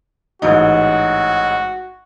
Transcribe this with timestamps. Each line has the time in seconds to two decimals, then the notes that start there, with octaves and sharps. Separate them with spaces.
0.42 A1 G#2 D#4 F#4